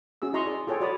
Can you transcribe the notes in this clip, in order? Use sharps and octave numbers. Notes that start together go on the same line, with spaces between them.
C#4 F#4 G#4 E6
E4 D#5 A#5 C6 C#6
G#4 D5
F4 G#4 A4 C#5 G5
F#4 C#5 D5 B5 D#6